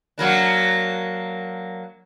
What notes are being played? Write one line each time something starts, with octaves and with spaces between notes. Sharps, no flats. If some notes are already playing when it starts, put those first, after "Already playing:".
F#3 A#3 D4